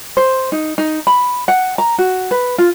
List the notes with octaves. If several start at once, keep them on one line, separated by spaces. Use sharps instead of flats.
C5
D#4
D#4
B5
F#5
A#5
F#4
B4
F4